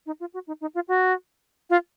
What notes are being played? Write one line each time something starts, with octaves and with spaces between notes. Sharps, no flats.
D#4
F4
F#4
D#4
D#4
F4
F#4
F4